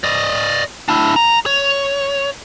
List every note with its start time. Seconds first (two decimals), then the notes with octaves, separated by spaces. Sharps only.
0.04 D5 D#5
0.89 D4 E4
1.16 A#5
1.46 C#5